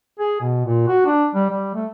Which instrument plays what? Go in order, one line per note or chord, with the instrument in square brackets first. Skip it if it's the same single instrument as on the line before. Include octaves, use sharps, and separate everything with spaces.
[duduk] G#4
B2
A#2
F#4
D4
G3
G3
A3